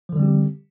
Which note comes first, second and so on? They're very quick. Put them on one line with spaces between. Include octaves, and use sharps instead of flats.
F3 D3 G3 C4 G4